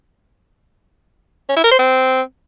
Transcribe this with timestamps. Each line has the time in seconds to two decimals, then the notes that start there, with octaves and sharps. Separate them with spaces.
1.49 C#4
1.56 E4
1.64 A#4
1.71 C5
1.79 C4